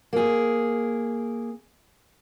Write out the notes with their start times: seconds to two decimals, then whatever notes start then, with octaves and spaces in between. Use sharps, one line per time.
0.13 A#3 G#4